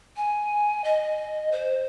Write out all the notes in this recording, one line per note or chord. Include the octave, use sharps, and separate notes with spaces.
G#5
D#5
C5